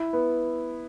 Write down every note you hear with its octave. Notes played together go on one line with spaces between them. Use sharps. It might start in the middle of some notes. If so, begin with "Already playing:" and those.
Already playing: E4
B3